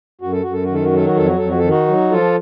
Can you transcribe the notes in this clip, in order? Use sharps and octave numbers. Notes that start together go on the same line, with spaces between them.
F#2 F#4
A4
F#2 F#4
A4
D#3 F#4
A4
F#4
F#3 A4
F#4
F2 A4
F#4
F2 A4
F#4
A4
D#3
D#4 F#4
F#3
F3 F4 A4